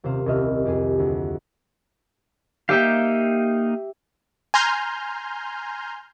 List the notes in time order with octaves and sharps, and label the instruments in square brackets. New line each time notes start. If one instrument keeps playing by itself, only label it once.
[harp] D#1 C3 C5 F5
D#1 C2 D#5 E5 F6
F2 G4 G#4 D#7
D2
[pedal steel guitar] A#3 D#4 F5 [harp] G4 E5 G5
[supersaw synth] G#5 A#5 C6 F6 G6